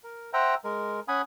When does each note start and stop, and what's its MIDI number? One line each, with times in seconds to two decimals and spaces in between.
0.04 0.30 70
0.33 0.55 72
0.33 0.55 76
0.33 0.55 78
0.33 0.55 79
0.33 0.55 82
0.64 1.00 56
0.64 1.00 70
1.08 1.22 61
1.08 1.22 78
1.08 1.22 80
1.08 1.22 83
1.08 1.22 87